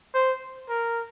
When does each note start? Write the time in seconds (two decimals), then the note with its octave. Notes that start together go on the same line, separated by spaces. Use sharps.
0.14 C5
0.69 A#4